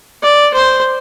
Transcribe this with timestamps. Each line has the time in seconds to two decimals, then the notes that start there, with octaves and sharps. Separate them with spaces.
0.22 D5
0.54 C5